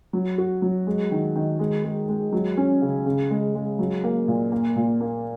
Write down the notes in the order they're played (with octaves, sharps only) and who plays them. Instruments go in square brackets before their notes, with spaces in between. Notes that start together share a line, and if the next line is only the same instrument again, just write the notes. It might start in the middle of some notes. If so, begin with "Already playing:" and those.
[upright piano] F#3
F#4
F#3
G#3
D#3
D#3
G#3
G#3
G#3
F#3
C#4
C#3
C#3
G#3
G#3
F#3
A#3
A#2
A#3
A#2
A#3